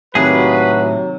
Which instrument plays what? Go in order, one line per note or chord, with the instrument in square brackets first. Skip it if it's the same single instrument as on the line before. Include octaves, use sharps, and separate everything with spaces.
[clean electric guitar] A2 G#4 [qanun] C3 D#3 A#3 [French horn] F#3 [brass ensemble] F#4 B4